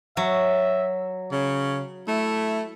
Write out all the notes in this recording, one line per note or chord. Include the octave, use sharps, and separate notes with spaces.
F#3 E5
C#3 C#5
A3 E4